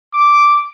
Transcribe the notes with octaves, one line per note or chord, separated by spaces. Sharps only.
D6